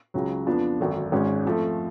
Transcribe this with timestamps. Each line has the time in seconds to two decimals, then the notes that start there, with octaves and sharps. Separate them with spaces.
0.14 C#2 C#3 F#3
0.47 F2 F3 B3 D4
0.80 G#1 F#2 D3
1.12 G#1 G#2 G#3 C#4
1.45 F2 F3 A3